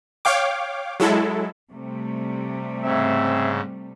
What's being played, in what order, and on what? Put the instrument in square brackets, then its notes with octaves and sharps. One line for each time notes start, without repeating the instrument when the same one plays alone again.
[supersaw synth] C#5 F5 G5 D6
F#3 G#3 E4 A4
[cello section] C3 G3 A3
[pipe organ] G#2 C#3 [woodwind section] C4 E5